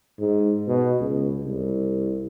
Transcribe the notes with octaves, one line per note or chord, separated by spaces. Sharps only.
G#2
B2
C#2
C2